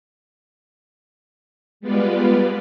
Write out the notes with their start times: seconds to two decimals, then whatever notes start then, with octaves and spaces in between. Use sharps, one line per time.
1.80 G3 G#3 B3 F4 B4 D5